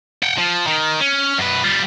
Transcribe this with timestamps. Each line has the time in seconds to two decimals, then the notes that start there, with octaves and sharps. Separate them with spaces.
0.23 F#5 G5
0.38 F3
0.67 D#3
1.01 C#4
1.38 F#2 B4
1.64 G3 F4